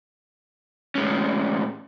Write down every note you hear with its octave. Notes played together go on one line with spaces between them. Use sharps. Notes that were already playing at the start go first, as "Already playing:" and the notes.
A2 G#3 C#4